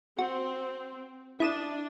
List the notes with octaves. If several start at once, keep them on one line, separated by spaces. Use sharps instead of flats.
C4 F#4
D4 E4 D#6 E7